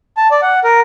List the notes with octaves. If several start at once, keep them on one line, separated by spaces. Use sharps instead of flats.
A5
D5
F#5
A#4